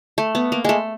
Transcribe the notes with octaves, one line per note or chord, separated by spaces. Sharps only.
A3
B3
A#3
G#3 A3